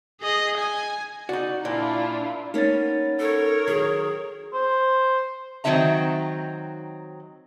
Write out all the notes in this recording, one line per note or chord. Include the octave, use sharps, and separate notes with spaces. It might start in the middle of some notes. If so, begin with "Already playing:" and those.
G#4 D#5
G#5
D#4 F#4 D5
A#2 D4 E4 F4 D5
A#3 B3 C#4 D#4 A6
A4 A#4 C#5
D#3 F#3 G#4
C5
D#3 F#3 C4 D#4 E5 A#5